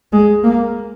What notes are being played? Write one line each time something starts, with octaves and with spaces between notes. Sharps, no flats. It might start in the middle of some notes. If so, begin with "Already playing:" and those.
G#3
A#3